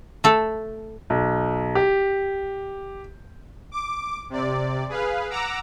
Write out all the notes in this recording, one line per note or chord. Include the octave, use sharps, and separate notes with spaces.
A3 A4
B1
G4
D6
C3 D5
G#4 B4 F5
F#5 A#5 D6 E6